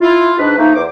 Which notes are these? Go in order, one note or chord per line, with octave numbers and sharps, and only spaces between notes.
E4 F4
G#2 D4 B4
F3 A3 A#3 D#4
E2 C5 D6